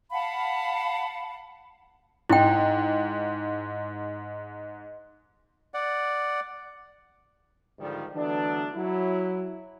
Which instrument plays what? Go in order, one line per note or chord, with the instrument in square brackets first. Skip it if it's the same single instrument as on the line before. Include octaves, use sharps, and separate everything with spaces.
[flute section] F5 F#5 A5 B5
[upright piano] G#2 [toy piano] E4 G5
[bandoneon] D5 F#5
[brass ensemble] G#2 D3 D#3 F3 G3
D3 E3 F#3 A3 B3 D4
F#3 E4